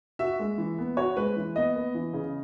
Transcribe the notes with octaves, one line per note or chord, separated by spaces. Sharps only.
F#4 E5
G#3
E3
B3
F#4 C#5
G#3 B4
E3
B3 D#5
B3
E3
C#3